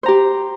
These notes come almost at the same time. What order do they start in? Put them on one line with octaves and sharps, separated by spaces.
C5 A#5 G4